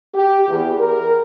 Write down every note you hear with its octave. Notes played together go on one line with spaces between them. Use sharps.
G4
E2
A#4